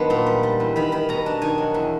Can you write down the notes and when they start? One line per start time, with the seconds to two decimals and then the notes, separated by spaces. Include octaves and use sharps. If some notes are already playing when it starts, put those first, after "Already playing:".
Already playing: D#3 F#3 B3 D4 C6
0.10 A#2
0.26 G3
0.43 G3
0.60 E2
0.76 D#3 B5
0.92 D#3 B5
1.09 B2 A#5
1.26 D4
1.42 D#3 G#5
1.58 F#3
1.74 E2